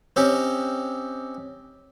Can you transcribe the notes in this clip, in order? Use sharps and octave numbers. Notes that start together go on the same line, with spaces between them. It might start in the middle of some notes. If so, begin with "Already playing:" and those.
C4 C#4 D#4 G4 C#5